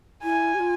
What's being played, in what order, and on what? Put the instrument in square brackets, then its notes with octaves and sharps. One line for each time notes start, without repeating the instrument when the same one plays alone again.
[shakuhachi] E4 [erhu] G#5
[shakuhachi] G4
F4